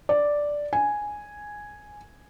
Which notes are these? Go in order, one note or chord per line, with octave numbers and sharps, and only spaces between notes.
D5
G#5